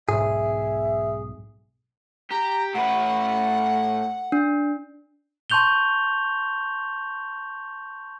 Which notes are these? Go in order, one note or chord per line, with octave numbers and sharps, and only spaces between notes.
B1 G#2 G#4 E5
G4 A#5
A2 B4 F#5
D4
A5 C6 C#6 G6 F7 G7